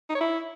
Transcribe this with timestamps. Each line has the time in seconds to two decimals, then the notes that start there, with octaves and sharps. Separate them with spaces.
0.10 D#4
0.15 C#5
0.20 E4